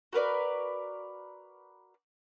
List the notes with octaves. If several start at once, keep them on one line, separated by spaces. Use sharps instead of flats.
F#4 A#4 B4 D5